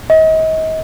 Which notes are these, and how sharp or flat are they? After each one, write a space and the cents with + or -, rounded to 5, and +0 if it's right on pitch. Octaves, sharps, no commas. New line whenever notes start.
D#5 +35